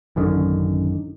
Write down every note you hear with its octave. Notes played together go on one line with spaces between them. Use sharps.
A1 F#2 D3 D#3